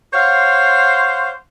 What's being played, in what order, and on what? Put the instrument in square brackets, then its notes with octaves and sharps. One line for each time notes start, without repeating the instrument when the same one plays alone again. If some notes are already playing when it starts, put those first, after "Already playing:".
[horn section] C5 C#5 F5 F#5 C6